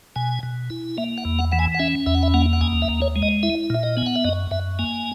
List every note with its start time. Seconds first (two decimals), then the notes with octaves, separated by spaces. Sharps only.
0.16 B2 G#5
0.43 B2
0.70 E4
0.98 A#3 E5
1.18 F#5
1.25 E2
1.39 F#5
1.52 E3 F#5
1.59 G#5
1.74 F#5
1.79 C#4 E5
2.06 E2 E5
2.15 F#5
2.23 E5
2.34 A#3 F#5
2.53 F#5
2.61 D#2 G#5
2.82 E5
2.89 D#2
3.02 C#5
3.16 G#3
3.22 D#5
3.43 E4 E5
3.70 A#2 E5
3.83 D#5
3.97 B3 G#5
4.06 F#5
4.16 E5
4.25 F#2 D#5
4.51 F#2 E5
4.79 A#3 G#5